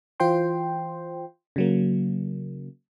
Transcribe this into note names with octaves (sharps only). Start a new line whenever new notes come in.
E3 F4 C5 G5 C6
C#3 F#3 A#3